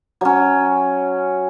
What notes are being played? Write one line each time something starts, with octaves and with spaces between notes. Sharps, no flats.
F#3 C#4